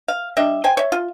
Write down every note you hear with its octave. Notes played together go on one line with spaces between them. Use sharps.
F5
G3 D4 D#5 E5
C5 G5 G#5
C#5 E5
F4